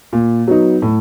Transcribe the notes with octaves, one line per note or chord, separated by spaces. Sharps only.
A#2
F#3 B3 D#4
A2